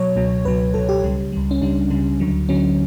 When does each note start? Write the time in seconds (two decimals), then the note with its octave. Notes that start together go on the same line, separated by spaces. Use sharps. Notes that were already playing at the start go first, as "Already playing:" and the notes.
Already playing: B2 F#3 C#5
0.16 C#2 B2 F#3
0.45 C#2 B2 F#3 B4
0.74 C#2 B2 F#3 A4
0.89 G4
1.03 C#2 C#3 G3
1.32 C#2 C#3 G3
1.51 C#4
1.62 C#2 C#3 G3 D4
1.90 C#2 C#3 G3
2.20 D2 D3 F#3
2.49 D2 D3 F#3 C#4